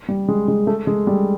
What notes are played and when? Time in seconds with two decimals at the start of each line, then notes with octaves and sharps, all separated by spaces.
0.09 G3
0.28 G#3
0.48 G#3
0.67 A3
0.87 G#3
1.07 G3